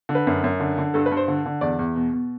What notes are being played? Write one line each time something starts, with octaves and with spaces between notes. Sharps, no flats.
D3
B4
F#2
F#2
D3
D3
G2 A4
B4
G2
C5
D3
D3
E2 D5
E2
B2
B2